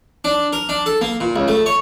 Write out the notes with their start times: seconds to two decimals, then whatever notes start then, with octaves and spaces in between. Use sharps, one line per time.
0.24 D4
0.53 A#4
0.69 D4
0.86 A4
1.01 A#3
1.20 A#2
1.36 C#2
1.48 A3
1.66 C#5